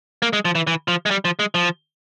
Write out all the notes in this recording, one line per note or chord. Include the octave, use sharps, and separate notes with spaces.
A#3
G#3
F3
E3
E3
F3
G#3
G3
F3
G#3
F3